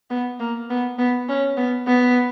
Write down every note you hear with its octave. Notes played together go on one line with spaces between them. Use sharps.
B3
A#3
B3
B3
C#4
B3
B3